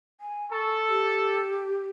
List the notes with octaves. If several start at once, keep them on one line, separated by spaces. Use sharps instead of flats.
G#5
A4 C#6
G4